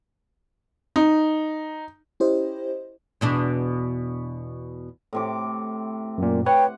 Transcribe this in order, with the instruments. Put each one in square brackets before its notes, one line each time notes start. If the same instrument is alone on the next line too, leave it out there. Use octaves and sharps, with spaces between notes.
[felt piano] D#4
[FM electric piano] C#4 E4 G4 C5 D#5
[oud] E2 B2 D4
[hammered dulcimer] A2 C3 D6
[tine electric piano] F#2 A#2
[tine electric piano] B4 C#5 [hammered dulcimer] F#5 [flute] G5